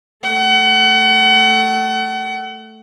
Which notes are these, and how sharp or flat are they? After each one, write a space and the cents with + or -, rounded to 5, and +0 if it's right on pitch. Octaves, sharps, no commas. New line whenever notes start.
A3 +0 F#5 +35